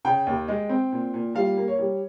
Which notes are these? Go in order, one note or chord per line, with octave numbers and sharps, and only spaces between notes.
C#3 G5
D#2
G#3
C4
A#2
A#2
G3 F5
A#3
C#5
G3